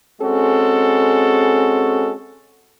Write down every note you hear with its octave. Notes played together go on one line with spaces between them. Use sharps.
G#3 C4 C#4 F#4 G#4 A4